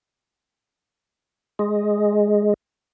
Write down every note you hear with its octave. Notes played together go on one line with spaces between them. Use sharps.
G#3